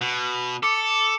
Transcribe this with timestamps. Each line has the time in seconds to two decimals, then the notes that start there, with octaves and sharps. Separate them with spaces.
0.01 B2
0.63 A4 D6 C#7